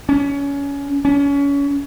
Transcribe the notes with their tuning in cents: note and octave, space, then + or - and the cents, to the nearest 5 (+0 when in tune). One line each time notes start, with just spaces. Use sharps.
C#4 +25
C#4 +30